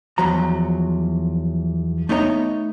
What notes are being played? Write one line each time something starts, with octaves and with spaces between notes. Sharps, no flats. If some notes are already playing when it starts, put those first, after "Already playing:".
E2 F3 F#3 A#5
A3 B3 D#4 C#5 G5 A#5